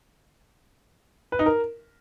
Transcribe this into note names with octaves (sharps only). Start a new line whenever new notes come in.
B4
D#4
A#4